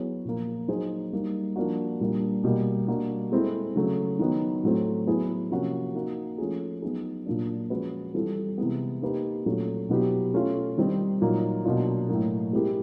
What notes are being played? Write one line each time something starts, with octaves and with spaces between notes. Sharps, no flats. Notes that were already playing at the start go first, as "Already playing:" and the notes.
Already playing: F#3 B3 E4 G#4 C#5
A#2 F3 A#3
F#3 A#3 D#4 G#4 C5
G3 A#3 D#4
F3 A#3 D4 F#4
A#2 G3 A#3 D4
B2 G3 A#3
G3 A#3 D4 F#4
G#3 C4 E4 A4
C#3 F#3 A3
D#3 F#3 B3
A2 F#3 A3 C4
F#3 B3 E4 G#4 B4
C3 F3 A#3 C#4 F#4
A#3 D#4 F#4
F3 A3 C#4 F4 G#4
F#3 B3 D#4 G#4
A#2 F#3 A#3 D4
F3 G#3 C#4 F#4 B4
E3 G3 C4 F4 A4
C3 E3 G#3 B3
A#3 D#4 G4 B4
A#2 F#3 A3 C#4
B2 F#3 B3 E4 G4
A3 C#4 F4
D#3 G3 C4 D#4
A#2 F#3 A#3 D#4
B2 F#3 A#3 D4 F4
A2 F#3 A#3
G#3 C4 E4 G4 A#4